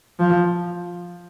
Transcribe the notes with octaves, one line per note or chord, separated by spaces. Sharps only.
F3